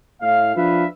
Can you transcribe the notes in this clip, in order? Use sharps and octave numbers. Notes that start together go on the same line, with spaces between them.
A2 F5
F3 D4 F4 B4 E5 F5